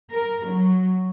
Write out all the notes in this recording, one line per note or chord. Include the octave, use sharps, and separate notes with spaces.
A#4
F#3